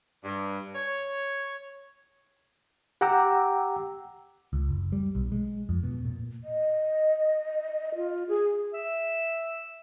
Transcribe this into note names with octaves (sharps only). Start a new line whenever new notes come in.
G2
C#5
G4 F#5 G5 A#5 D6 E6
C#2
F#1
G3
B1
G#3
F2
B2
A#2
D#5
F4
G#4
E5